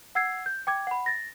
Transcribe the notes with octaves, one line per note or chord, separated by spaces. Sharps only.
F#5 E6 G#6 C7
G6
G5 D6 G#6
F#5 B5
A6 A#6